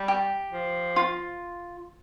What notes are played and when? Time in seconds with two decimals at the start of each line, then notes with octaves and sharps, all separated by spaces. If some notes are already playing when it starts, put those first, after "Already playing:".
Already playing: G3
0.08 G4
0.52 F3
0.96 F4